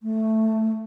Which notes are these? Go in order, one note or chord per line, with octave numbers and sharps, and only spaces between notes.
A3